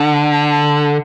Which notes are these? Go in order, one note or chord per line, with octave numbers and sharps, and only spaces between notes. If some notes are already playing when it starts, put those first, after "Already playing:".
Already playing: D3